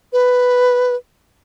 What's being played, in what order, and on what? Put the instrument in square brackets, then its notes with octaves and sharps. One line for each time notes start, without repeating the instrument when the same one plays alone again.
[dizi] B4